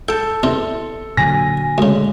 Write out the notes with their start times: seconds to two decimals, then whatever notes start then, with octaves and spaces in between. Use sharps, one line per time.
0.08 A4 G5 A5
0.43 E2 C3 C4
1.17 A#2 D3 F#3 G#5 A#6
1.78 D2 C#3 G#3